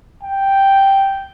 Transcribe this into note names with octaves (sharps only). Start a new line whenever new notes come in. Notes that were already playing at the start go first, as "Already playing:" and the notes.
G5